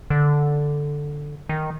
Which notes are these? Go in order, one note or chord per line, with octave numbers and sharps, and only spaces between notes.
D3
D#3